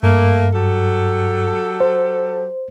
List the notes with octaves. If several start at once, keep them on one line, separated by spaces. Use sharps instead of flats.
G2 A3 A#3
F#3 G4 A4
C5